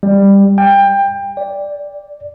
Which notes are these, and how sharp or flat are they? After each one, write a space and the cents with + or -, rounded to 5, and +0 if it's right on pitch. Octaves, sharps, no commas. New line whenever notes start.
G3 +15
G5 +20
D5 -10